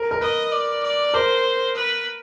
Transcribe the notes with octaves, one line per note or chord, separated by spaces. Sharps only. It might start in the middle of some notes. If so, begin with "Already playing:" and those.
Already playing: A#4
A#4
B4 D#5
D5
D5
A#4 C5
B4